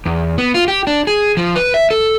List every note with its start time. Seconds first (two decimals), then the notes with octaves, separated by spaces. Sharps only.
0.06 E2
0.38 B3
0.54 F4
0.68 G4
0.87 D4
1.07 G#4
1.37 F3
1.56 B4
1.74 E5
1.91 A4